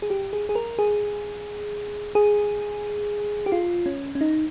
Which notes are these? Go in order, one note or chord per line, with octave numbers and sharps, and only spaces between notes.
G#4
G4
G#4
G#4
A#4
G#4
G#4
G4
F4
C#4
C#4
D#4